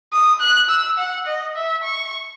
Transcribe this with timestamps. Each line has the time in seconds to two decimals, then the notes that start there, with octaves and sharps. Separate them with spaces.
0.13 D#6
0.41 F#6
0.70 E6
0.98 F#5
1.26 D#5
1.56 E5
1.84 C#6